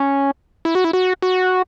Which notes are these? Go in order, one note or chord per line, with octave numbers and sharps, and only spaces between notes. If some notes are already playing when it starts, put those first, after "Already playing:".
Already playing: C#4
E4
F#4
E4
F#4
F#4